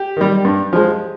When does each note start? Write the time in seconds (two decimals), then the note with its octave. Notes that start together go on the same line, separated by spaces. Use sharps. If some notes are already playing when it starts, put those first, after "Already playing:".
Already playing: G4
0.17 D#3 G3
0.45 G2
0.73 F3 G#3